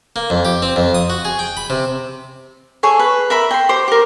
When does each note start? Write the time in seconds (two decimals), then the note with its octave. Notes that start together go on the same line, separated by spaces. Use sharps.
0.16 A#3
0.30 F2
0.45 G4
0.62 C4
0.76 F2
0.94 D#6
1.10 F#4
1.25 G#4
1.39 G5
1.57 B5
1.70 C3
2.83 G#4 A4 C#5 G#5
2.99 B4
3.30 A#4 E5 B5
3.51 G5 C6
3.69 G4 C5
3.88 G4 A#4